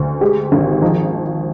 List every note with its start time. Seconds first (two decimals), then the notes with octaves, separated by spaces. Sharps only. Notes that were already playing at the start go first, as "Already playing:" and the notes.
Already playing: D2
0.21 G#3 G4
0.52 G#1
0.82 F3 D#4